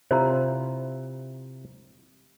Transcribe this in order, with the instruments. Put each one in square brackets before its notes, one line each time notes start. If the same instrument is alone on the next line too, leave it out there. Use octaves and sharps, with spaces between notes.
[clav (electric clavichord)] C3 E4 F4 [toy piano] C5 A#5